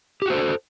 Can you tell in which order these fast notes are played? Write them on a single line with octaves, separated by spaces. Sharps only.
G4 F#4 C5 A4